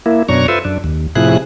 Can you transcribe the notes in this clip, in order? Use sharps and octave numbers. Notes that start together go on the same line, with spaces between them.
A#3 E4
F#2 B2 D4 C#5 A#5 C#6
F4 A4 B4 C5 E5
F#2 D4
D#2
A2 C3 F3 E4 G#4 F#6